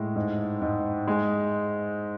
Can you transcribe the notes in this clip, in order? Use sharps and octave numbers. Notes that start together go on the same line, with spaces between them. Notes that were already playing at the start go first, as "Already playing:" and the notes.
Already playing: A2 G#3
G#2
G#2
G#3